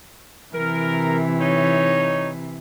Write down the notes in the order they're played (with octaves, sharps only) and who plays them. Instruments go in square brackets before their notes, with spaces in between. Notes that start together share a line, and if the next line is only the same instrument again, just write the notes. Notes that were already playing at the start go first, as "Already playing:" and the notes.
[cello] C3 E3 [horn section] A#4
[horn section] D#4 C#5